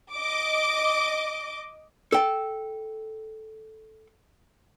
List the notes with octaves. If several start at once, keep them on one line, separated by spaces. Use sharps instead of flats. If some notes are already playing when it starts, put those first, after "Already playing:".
D#5 D6
A4 G5